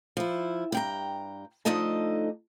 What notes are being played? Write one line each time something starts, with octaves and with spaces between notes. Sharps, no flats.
F3 E4
G2 G5 A#5
D3 F3 A3 D#4 D#5 A5